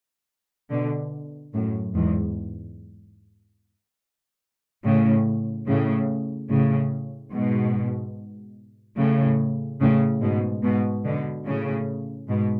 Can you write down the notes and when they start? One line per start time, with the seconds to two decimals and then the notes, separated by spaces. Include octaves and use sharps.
0.70 B2 D3
1.54 F#2 A2
1.95 E2 G#2
4.84 A2 C#3
5.67 A2 C#3
6.50 A2 C#3
7.32 G#2 B2
8.97 A2 C#3
9.80 A2 C#3
10.21 G#2 B2
10.63 G#2 B2
11.04 B2 D3
11.46 A2 C#3
12.28 G#2 B2